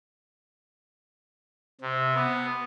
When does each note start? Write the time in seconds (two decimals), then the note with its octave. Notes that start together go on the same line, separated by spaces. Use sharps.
1.81 C3
2.15 B3